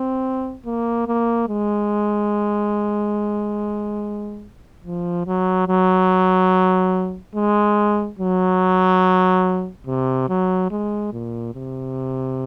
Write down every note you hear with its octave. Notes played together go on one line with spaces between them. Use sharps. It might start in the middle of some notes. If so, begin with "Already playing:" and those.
Already playing: C4
A#3
A#3
G#3
F3
F#3
F#3
G#3
F#3
C3
F#3
G#3
A#2
C3